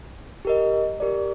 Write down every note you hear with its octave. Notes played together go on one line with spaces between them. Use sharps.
G4 A#4 D#5
G4 A#4 D5